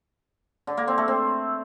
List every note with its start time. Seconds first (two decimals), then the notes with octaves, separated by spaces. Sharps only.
0.67 D3
0.77 A#3
0.88 C4
0.98 A3
1.08 C4